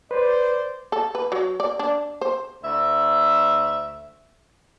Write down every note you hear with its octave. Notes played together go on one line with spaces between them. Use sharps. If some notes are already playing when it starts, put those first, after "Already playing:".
B4 C5 D5
A4
B4
F#3
D5
D4
C5
D2 E5